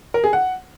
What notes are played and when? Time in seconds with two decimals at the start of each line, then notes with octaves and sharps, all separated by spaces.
0.14 A#4
0.24 G#4
0.33 F#5